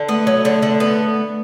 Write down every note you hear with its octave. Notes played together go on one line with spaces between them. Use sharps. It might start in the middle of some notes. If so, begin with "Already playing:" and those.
Already playing: D3
A3 B3
F#3
D3
D3
B3